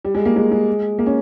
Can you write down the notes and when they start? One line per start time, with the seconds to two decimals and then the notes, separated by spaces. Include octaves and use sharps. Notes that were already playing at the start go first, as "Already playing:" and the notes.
0.05 G3
0.15 G#3
0.25 A#3
0.36 G#3
0.52 G#3
0.99 A#3
1.06 C#4